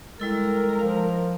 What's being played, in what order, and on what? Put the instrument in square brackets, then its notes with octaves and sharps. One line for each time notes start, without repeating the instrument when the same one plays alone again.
[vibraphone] G3 E4 A4 [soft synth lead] G#3 [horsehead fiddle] A#4
[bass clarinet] F3 [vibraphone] F5